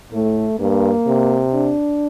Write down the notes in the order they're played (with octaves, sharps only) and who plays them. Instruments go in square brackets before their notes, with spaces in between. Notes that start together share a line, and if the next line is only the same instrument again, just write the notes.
[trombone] A2 [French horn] A3
[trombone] G2 [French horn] A#3
[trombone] C3
[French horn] D4